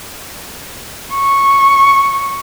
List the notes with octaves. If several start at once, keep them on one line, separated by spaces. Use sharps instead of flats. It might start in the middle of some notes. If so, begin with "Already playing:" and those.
C#6